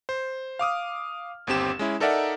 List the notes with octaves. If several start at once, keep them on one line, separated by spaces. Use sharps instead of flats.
C5
F5 D6 D#6 F6
G1 D#2 C4 G4 E7
G#3 C#4 E4
D#4 A4 A#4 D5 E5 F#5